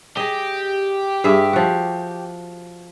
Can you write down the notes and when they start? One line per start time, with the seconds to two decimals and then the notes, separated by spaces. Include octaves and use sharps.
0.17 G4 G#4 D#5
1.24 G2 G#4 E5
1.53 F3 F#4